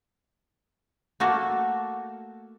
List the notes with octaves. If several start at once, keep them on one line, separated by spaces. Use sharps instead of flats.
A3 A#3 F#4 A4